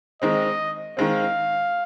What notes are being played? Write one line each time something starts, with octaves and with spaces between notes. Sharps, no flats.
D#3 G#3 C4 D#5
D#3 G#3 C4 F5